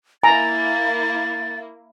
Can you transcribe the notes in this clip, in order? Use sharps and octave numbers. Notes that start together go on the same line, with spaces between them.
A#3 E4 G#5 A#5 A6